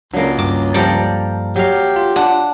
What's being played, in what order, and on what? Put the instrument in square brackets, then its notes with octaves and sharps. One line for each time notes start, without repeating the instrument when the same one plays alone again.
[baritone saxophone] C#2 [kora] F#3 A#3 [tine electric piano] D4
[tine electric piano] G2 [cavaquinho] D6
[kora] F3 G3 [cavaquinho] A4 D5 A#5
[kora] F#3 F5 [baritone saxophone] G4
[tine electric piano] F4
[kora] D4 [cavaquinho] F#5